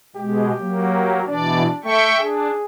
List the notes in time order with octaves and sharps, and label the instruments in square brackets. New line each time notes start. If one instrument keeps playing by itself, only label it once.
[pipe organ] B2 G#3 [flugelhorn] G4
[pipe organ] F#3 A#3
[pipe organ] B2 E3 D5 [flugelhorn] D4
[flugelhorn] A3 [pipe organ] E5 G5 C#6
[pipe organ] D4 [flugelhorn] G#4